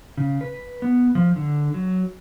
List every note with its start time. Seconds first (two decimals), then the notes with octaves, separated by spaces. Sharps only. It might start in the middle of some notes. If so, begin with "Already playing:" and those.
0.17 C#3
0.41 B4
0.82 B3
1.15 F3
1.36 D3
1.74 F#3